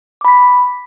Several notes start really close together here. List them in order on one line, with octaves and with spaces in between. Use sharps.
D6 B5 B6